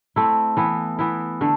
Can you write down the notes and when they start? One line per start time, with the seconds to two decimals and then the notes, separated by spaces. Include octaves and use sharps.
0.16 A3 C4 E4
0.57 E3 B3 E4
0.99 E3 B3 E4
1.41 D3 A3